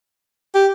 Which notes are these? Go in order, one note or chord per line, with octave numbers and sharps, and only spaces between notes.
G4